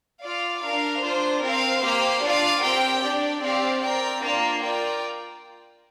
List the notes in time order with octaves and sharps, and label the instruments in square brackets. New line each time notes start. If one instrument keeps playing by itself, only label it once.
[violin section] F4 D5 F5
D4 A#4 F5
D4 F4 C5
C4 A#4 F5
A#3 G4 C5 F5
D4 F4 D5 F5
C4 G4 A#4 G5
D4 G4 D5
C4 G4 D5 F5
C4 A#4 D5 G5
A#3 D4 F4 D5 F5
F4 A#4 D5 G5